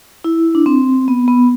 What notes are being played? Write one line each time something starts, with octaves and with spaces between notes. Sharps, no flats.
E4
D4
C4
B3
B3